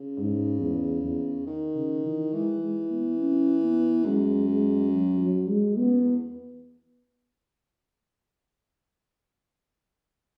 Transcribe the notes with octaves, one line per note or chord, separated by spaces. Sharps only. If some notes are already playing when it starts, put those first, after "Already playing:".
Already playing: C#3
G#2
E2
E2
D#3
C#3
E3
E3 G#3
G#3
B3
C#4
B3
F#2 G#3
G#3
F#3
F#3
G#3
F#2 B3
E2